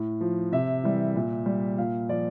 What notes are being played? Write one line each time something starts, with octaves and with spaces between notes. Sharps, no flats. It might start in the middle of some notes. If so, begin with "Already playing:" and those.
Already playing: A2
F3
C3 E5
E3 G3
A#2
G3
A#2 F5
F3 D5